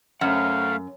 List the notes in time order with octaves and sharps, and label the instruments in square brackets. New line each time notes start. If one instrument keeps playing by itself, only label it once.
[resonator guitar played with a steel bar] F#2 [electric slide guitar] A3 F#5 [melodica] F5